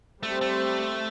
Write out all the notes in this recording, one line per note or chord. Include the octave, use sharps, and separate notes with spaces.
G3 A3 C4 G4 C5
A3